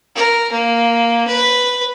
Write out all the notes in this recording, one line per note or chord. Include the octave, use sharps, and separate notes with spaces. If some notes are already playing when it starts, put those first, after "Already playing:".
A#4
A#3
B4